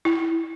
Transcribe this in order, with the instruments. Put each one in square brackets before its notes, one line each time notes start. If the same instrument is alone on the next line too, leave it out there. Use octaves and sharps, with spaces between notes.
[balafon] E4